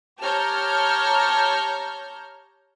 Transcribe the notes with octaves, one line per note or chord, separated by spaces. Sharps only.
G4 C#5 A5 A#5 F6 G6